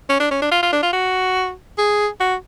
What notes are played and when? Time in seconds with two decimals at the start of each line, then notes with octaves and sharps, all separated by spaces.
0.09 C#4
0.19 D4
0.31 C#4
0.41 D4
0.51 F4
0.62 F4
0.72 D4
0.83 F4
0.93 F#4
1.78 G#4
2.20 F#4